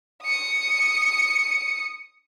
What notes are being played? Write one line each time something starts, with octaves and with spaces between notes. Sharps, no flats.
D#6 C#7